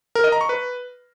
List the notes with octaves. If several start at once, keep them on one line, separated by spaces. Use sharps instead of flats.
A#4
D#5
A#5
C#6
B4